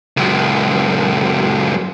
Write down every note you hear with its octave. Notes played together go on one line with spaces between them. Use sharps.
C#2 F#2